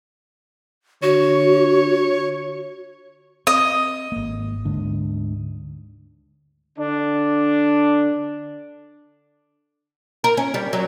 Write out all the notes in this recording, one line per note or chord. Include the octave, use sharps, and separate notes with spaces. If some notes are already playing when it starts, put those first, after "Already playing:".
D3 F#4 C#5
C4 D#5
G#1 A#3
D2 G#2 D3
D3 D4
A#4
C#4
G3
F#3